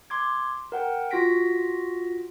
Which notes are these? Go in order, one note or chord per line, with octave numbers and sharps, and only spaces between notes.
C6 D6 G#6
A#4 F#5 G5
F4 F#4 A#6 B6 D7